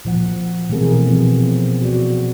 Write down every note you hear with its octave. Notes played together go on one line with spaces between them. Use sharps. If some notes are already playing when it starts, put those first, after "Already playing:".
A#2 F3 F#5
B2 E3 A3 C4 G#4 A#4
B2 F3 B3 C4
F#4 D5